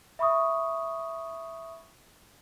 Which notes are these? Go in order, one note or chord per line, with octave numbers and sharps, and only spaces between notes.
E5 B5 C#6 D#6